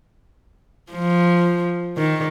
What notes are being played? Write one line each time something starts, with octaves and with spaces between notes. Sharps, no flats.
F3
D#3